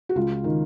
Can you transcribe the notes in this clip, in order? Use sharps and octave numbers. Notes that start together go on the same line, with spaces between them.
F#4
C#2 F4
D#3